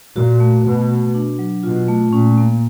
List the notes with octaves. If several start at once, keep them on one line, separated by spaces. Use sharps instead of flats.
A#2 F#4
A3
B2 A3
F#4
D4
F#3
B2 F4
A3
A#2 C#4
A#3